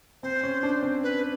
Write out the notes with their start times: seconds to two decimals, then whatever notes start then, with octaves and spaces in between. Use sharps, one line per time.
0.23 C4 C5
0.43 C#4
0.63 D4
0.83 C4
1.03 B4